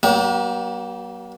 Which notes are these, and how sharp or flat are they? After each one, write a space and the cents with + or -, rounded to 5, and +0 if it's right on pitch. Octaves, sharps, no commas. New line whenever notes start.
F#3 +35 A#3 +45 G4 -20